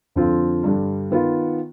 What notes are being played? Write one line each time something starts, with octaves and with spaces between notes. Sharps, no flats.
F2 D3 F3 C4 F4
G2 D3 G3
D#3 B3 F4